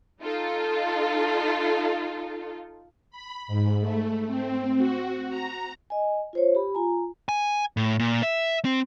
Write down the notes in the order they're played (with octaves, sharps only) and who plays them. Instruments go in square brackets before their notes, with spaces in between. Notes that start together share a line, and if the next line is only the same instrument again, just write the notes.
[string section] D#4 F4 A4
[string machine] B5
G#2
A3
C4
F#4
A#5
[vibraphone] D#5 G#5
F4 C5 C#5
G4 B5
F4 G#5 A#5
[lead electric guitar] G#5
A2
A#2
E5
C4